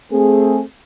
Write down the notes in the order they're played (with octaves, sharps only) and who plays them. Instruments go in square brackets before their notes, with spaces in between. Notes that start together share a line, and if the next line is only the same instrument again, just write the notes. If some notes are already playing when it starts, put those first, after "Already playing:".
[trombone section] A3 C4 G#4